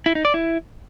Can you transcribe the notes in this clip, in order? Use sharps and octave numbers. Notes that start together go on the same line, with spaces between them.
E4
D#4
D5
E4